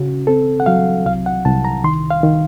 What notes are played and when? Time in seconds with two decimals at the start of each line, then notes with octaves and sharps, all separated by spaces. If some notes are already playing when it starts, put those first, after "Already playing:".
Already playing: C#3 C#4 F#4
0.27 C4 A4
0.60 F#5
0.66 F#3 F5
1.06 C2 F5
1.26 F#5
1.45 C2 A5
1.65 A#5
1.84 D#3 C6
2.10 F5
2.23 D#3